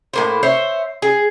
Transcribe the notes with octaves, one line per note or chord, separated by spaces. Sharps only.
A2 A#3 C5
C5 C#5 E5
G#4